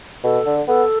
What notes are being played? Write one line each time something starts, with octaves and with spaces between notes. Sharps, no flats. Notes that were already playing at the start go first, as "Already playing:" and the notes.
B2 A4
D3
B3 A4